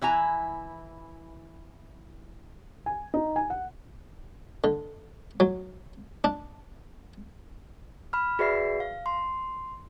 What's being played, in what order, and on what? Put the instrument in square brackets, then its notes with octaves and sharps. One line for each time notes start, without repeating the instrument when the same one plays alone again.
[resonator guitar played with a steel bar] E3 E4 G#5 A#5
[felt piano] G#5
D#4
G#5
F#5
[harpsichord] D3
F#3
D4
[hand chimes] B5 F6
F#4 G#4 B4 D5 E5 C7
F5
C6